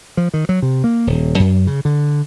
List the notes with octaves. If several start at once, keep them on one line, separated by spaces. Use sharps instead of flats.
F3
D#3
F#3
C3
A#3
D#1
F#2
C#3
D3